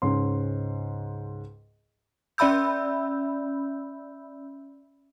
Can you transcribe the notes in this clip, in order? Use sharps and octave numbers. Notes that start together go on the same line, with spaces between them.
C#2 G#2 C#4 C6
C#4 D5 E5 B5 E6 G6